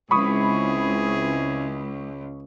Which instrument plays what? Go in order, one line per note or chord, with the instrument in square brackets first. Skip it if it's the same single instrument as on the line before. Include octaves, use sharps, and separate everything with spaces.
[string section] C#2 [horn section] C4 E4 G#4 [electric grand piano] B5 C#6 D#6